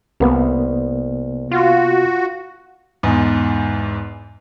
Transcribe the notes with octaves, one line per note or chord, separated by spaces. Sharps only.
C2 C3 A#3 B3
F4 F#4
E2 G#2